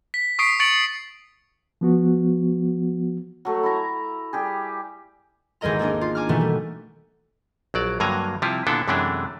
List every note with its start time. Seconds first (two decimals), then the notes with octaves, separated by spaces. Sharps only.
0.14 B6
0.39 C#6 D#6 B6 C7 D7
0.60 C#6 A6 C#7 D7 F#7
1.81 F3 B3 F#4
3.45 F#3 A3
3.63 E4 E5 A#5
4.33 G3 G4 G#4
5.61 G#1 E2 G#3 A#4 D#5 A#5
5.79 A#3 D4 D#4 A#4
6.01 F4
6.15 G#5 A#5 D6 F6
6.29 B2 D#3 E3 A3 B3
6.41 G3
7.74 A#1 F#3 D5
8.00 G2 D3 F#3 A#3 G#5 A#5
8.42 C3 F3 G3 E4 F4
8.67 A#2 D3 B3 D4 E4 A4
8.88 F#2 C3 E3 G#3 A3 D4